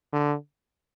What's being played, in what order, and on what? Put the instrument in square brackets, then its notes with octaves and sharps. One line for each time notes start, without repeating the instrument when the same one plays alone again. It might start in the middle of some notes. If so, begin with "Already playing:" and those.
[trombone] D3